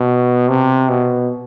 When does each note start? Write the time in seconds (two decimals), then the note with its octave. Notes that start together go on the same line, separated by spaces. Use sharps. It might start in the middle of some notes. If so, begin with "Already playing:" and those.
Already playing: B2
0.49 C3
0.89 B2